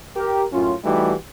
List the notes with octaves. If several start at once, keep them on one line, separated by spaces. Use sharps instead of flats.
G4 A#4
F#2 A2 C#4 F4
E3 G3 A3 D#4 F#4 G4